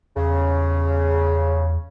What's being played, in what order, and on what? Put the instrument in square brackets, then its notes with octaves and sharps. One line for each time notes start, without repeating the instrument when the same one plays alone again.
[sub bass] E2 [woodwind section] C#3